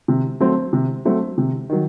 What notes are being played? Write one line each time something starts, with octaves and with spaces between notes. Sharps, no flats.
C3
F#3 A3 C4
C3
F#3 A3 C4
C3
D#3 F#3